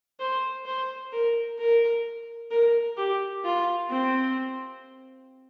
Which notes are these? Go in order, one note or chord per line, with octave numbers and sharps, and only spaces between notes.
C5
C5
A#4
A#4
A#4
G4
F4
C4